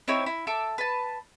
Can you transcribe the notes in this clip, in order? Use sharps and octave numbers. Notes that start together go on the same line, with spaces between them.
C4 D#4 E4 C#5
E4
A4 E5 D6
B4 A5